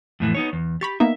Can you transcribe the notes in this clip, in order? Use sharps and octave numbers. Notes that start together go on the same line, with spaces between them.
F2 A2 E3
B3 D#4 C#5
E2
G4 B5 C#6 A6
A#3 B3 D#4 E5